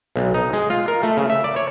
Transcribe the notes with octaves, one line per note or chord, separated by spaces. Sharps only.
B1
D#4
G#3
F4
A#4
A3
C#3
E5
D5
C#5